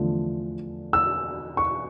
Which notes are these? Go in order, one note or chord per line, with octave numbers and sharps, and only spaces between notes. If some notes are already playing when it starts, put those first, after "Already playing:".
Already playing: E2 D3 F3 A3
E6
C#6